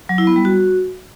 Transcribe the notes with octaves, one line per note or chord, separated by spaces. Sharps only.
F#3
E4
B3
G3
F#4